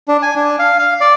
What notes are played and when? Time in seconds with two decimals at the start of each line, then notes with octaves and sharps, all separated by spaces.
0.08 D4
0.23 G#5
0.36 D4
0.59 F5
0.79 F5
1.01 D5